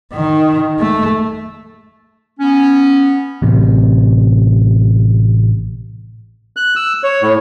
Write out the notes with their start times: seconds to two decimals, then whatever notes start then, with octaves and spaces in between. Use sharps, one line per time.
0.13 D#3
0.79 A3
2.40 B3 C#4
3.42 A1 C3
6.56 F#6
6.76 E6
7.03 C#5
7.22 A2